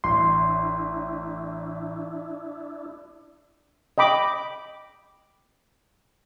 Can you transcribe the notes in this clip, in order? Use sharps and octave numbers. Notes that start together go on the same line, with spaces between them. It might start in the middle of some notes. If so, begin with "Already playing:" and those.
A1 D4 E4 C6
D#5 G5 B5 D6